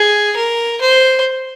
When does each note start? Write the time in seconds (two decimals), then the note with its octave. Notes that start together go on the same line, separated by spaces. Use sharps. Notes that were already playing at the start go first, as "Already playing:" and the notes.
Already playing: G#4
0.37 A#4
0.81 C5